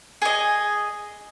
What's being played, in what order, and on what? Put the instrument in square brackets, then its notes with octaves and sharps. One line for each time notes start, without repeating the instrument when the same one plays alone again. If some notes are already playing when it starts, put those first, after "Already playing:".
[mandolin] G#4 D#5